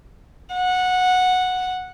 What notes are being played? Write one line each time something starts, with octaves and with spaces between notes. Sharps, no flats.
F#5